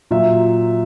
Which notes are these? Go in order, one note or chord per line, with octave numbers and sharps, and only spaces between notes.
A#2 F#3 E5